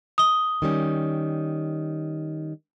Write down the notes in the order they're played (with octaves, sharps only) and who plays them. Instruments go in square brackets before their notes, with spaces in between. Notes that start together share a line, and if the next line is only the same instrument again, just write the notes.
[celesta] D#6 G7
[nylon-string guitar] D#3 G3 C#4